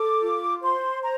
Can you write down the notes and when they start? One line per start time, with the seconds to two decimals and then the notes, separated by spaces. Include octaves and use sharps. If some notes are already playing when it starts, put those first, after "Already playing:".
Already playing: A4 D6
0.21 F4
0.62 C5 C6
1.03 A#5